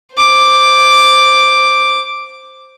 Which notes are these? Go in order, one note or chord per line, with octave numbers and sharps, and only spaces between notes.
C5 D6